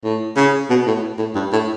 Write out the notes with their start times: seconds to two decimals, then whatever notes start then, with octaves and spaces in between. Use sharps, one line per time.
0.04 A2
0.36 C#3
0.70 B2
0.87 A2
1.18 A2
1.35 G2
1.53 A2